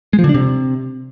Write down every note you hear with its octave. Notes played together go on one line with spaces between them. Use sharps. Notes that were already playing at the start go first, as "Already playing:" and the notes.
G#3
F3
D3
D4
C3